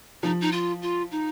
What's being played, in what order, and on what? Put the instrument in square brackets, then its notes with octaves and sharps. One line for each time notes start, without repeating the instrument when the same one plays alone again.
[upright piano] F3 [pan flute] D#4
[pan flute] D#4
F4
F4
D#4